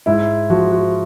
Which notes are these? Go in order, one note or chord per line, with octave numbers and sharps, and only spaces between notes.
G#2 E4
F3 F#4
F#4